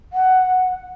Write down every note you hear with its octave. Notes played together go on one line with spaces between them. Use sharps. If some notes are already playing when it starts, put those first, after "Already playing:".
F#5